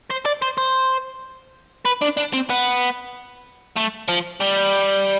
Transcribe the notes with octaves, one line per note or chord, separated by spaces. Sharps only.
C5
D5
C5
C5
B4
D4
D4
C4
B3
A3
F3
G3